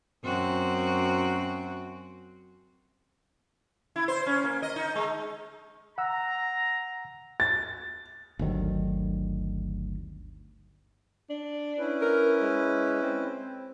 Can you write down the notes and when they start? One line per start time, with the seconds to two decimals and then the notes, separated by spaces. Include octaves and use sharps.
0.25 F#2 C4 F#4
3.96 E4
4.08 C5
4.26 C#4
4.44 A#3
4.62 D#5
4.76 D#4
4.96 G#3
5.98 F#5 A#5 E6
7.40 A6
8.39 G1 D2 D#3 F#3
11.30 D4
11.78 C#4 E4 B4
12.01 A#4
12.41 G#3
13.03 C4